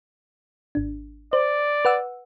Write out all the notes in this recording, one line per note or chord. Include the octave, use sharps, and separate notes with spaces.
G#1 D4
C5 D5
B4 F#5 E6